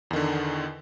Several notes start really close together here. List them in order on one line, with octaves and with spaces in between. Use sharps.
E2 D#3 D3